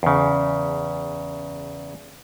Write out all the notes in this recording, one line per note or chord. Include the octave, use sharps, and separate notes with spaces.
E2 C#3